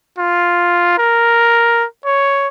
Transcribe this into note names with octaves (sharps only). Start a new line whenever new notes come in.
F4
A#4
C#5